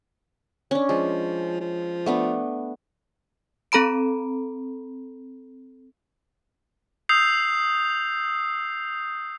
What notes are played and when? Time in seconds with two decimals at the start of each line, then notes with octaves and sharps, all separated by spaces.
0.71 C#4 D4
0.89 F3 G#3
1.60 F3
2.06 A3 B3 D4
3.72 C4 A4 A#5 B5 D7
7.09 D#6 E6 G6 C7 F7